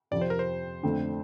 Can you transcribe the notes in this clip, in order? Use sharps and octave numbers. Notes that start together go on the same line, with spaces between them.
F2 C3 F3 C4 D5
C5
A#4
C5
F2 D3 A3 C4